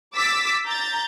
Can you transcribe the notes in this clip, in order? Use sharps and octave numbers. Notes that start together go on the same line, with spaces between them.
D6 E6 A6 B6
A#5 G6 A6